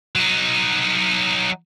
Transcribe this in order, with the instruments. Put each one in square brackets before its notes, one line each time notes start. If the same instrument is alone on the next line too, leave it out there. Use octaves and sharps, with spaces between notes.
[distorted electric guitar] F#3 D#4